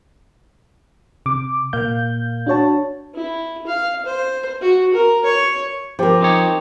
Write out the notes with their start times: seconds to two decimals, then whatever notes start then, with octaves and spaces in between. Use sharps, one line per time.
1.26 C3 D6
1.73 A#2 A#3 F5 G6
2.47 D4 F#4 C#5 A5
3.14 E4
3.67 F5
4.06 C5
4.61 F#4
4.94 A#4
5.24 C#5
5.99 F3 G4 A#4 C5 D6
6.21 C4 D#4 C#5